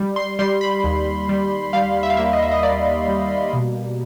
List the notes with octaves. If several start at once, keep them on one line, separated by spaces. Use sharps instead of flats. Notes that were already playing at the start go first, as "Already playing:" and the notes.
Already playing: G3
C6
G3 C6
B5
D#2
G3
G3 F5
E5
F5
A#3 E5
D#5
E5
D#5
A#3 D5
G3
B2